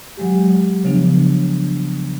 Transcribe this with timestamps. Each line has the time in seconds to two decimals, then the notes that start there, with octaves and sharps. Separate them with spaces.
0.17 F#3 G#3 G4
0.84 C#3 F3 B3 D4